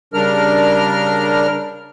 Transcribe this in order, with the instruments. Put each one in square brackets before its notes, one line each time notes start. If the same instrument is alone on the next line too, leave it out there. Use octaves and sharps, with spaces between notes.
[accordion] C#3 G3 D4 A#4 F6